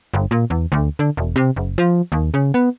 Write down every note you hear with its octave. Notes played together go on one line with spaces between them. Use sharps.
G1
A#2
E2
D2
D3
E1
C3
F#1
F3
D#2
C#3
B3